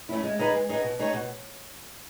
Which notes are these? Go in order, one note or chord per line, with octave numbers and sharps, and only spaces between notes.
A3 C#4 E4
G#3
D#4 G#4 B4 D#5
G#3
D#4 G#4 B4 D#5
B2
A3 D#4 G#4 C#5
B2